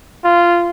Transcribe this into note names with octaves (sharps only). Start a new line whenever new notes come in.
F4